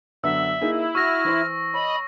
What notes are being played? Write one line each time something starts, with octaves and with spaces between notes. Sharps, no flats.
F#2 D3 B3 E5 E6
A#3 D#4 E4 G#4
F#4 C#6 F6 A#6
E3 C5 C6
C#5 D#5 B5